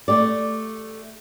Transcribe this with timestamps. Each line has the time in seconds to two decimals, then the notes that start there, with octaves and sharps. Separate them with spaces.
0.08 A3 G4 D5